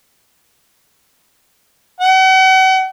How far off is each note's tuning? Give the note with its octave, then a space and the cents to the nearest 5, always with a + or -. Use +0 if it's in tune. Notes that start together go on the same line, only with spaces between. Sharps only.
F#5 +40